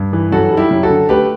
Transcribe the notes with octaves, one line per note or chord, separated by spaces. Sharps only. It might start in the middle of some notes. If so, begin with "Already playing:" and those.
Already playing: G2
E3
F#2 F#4 A4
G3
E4 G4
F#2
F#4 A4
D3
A3 G4 B4